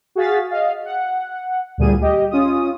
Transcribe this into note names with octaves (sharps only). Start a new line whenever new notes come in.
F#4 G#4 F5 A6 B6
D#5 F5
F#5
D2 A#2 G3 G#4 D#7
G4 D#5
C#4 F4 D#6